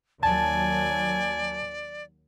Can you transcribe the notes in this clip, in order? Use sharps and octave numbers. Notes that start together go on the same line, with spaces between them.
D#2 F#3 D5 G#5 A5